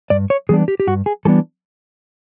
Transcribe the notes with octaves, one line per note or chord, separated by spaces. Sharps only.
G2 D5
C#5
E3 G3 B3 D4 G#4
G4
G4
G2 F#4
G#4
E3 G3 B3 D4 A4